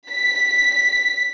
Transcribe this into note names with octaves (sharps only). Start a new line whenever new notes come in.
B6